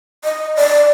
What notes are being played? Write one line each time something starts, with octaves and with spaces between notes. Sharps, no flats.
D#5
D5